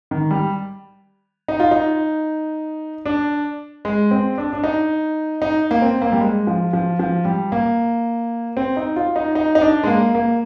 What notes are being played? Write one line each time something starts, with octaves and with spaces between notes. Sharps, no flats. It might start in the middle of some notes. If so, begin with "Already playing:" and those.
D#3
G3
D#4
F4
D#4
D4
G#3
C4
D4
D4
D#4
D#4
A#3
C4
A#3
G3
G#3
F3
F3
F3
G3
A#3
C4
D#4
F4
D#4
D#4
D#4
D4
G#3
A#3
A#3